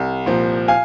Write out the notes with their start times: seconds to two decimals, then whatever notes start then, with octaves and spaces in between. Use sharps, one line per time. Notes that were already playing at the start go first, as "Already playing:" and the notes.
Already playing: C2
0.26 A#2 F3
0.68 F5 G#5